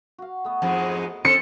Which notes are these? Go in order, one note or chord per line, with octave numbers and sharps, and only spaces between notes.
F#4 F5
A3 B3 D#5
F2 G#2 G#3
C4 A4 C5 C#7